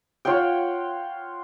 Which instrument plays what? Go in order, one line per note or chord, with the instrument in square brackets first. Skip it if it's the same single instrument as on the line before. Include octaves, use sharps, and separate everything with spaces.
[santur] F4 C#5 F#5 G5